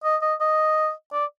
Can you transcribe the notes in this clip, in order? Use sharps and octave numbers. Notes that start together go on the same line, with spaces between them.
D#5
D#5
D#5
D5